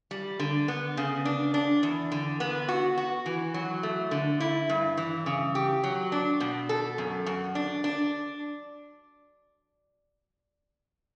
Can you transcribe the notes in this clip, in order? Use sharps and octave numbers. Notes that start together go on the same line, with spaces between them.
G3
D3
B3
C#3
D4
D4
E2
D3
B3
F#4
F#4
E3
F#3
A3
D3
E4
G2
E3
C#3
G4
F#3
D4
B2
A4
F#2
F#2
D4
D4